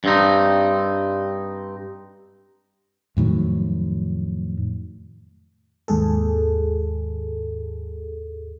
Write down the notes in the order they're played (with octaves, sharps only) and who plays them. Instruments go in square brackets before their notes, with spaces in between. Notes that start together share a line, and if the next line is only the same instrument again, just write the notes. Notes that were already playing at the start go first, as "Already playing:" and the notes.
[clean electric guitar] G2 C4 D#4
[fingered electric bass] F2 A2 D#3 F#3
[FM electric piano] D#2 G#2 G#4 A4